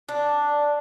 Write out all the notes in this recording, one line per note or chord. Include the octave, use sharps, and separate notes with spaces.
D4